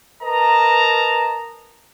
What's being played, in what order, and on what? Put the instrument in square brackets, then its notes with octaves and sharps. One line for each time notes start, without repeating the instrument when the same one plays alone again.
[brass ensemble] A#4 B4 D#5 A5 A#5